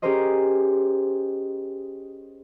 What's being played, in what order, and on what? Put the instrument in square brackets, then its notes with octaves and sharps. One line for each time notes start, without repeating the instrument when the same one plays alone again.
[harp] C#4 G4 G#4 A#4 C5 D#5